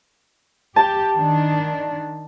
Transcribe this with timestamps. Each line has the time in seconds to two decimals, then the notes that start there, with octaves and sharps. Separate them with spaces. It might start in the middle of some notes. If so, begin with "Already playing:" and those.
0.76 G4 A5
1.14 D#3 D4